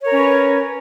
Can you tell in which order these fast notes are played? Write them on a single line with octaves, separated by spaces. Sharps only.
C#5 A#4 C#4 B4